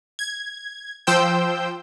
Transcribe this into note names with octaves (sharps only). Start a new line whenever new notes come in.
G#6
F3 C5 G5 E6 G6